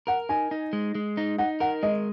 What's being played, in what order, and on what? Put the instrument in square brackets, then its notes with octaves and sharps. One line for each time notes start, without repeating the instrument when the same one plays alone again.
[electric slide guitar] A#4 [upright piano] F#5
[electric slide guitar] D#4 [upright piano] G#5
[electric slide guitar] D#4
G#3
G#3
D#4
[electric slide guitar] D#4 [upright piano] F#5
[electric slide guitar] A#4 [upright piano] F#5
[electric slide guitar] G#3 [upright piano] D#5